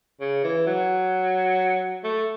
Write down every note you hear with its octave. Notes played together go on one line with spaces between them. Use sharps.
C#3
E3
F#3
A3